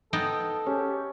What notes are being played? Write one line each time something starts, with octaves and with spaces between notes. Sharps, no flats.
B3 D#4 A4 G5
C#4 G4 G#4